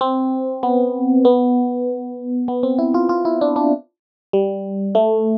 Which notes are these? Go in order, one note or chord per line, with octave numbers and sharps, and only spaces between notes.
C4
B3
B3
B3
C4
E4
F4
F4
E4
D4
D4
G3
A3